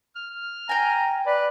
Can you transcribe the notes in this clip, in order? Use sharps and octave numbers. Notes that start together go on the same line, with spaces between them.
F6
G5 G#5 A#5
B4 D5